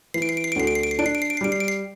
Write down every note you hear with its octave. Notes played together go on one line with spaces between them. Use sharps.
E3 C7
D7
C7
D7
C7
D7
D2 C7
D7
C7
D7
C7
D4 D7
C7
D7
C7
D7
C7
G3 D7
C7
D7
C7